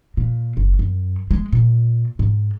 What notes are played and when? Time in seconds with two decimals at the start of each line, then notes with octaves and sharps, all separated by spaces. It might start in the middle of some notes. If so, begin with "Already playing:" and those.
0.17 A#2
0.57 F#1
0.79 F#2
1.31 G#3
1.52 A#2
2.19 G#2